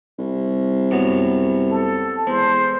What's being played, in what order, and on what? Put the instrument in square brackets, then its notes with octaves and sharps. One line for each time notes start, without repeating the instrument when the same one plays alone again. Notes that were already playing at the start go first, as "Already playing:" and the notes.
[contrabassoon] C2
[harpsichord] F#2 F#3 B3
[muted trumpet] A4
[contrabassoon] E2 [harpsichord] G#3 [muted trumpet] C5